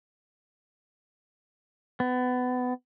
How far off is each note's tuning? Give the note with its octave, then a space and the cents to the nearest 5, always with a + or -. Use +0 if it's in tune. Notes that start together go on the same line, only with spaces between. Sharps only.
B3 +25